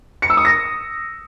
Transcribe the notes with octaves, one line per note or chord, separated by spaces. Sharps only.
C#7
E6
D#6
A#6